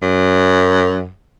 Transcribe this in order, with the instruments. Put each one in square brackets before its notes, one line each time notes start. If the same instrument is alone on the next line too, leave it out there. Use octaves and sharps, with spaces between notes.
[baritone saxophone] F#2